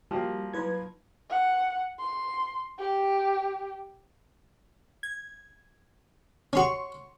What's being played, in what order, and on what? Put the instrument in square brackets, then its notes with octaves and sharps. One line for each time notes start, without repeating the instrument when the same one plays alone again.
[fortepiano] F3 A#3 [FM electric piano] G3 [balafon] F#4 G5
[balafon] F#3 D#4 E4 [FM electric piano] B4 G#6
[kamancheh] F#5
C6
G4
[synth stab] G#6
[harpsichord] C#4 F#4 [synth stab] C#5 C6 C#6